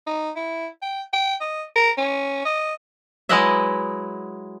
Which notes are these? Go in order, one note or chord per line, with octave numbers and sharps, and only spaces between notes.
D#4
E4
G5
G5
D#5
A#4
C#4
D#5
F#3 G#3 E4 B4 D#5 E5